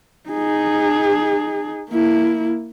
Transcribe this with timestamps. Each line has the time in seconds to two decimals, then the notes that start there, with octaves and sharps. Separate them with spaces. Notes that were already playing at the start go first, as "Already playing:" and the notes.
0.29 D#4 G#4
1.90 A#3 E4